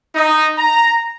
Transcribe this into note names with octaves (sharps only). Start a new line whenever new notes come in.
D#4
A#5